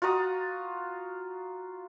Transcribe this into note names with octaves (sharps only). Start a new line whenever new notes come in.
F4 F#4 A#5 D#6